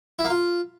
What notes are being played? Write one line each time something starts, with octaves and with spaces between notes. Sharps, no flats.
E4
A#3
F4